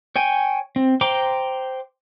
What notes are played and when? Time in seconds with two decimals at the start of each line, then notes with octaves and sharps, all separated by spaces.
0.16 C#5 G5 G#5
0.76 C4
1.01 C5 G5 A#5 C6 D6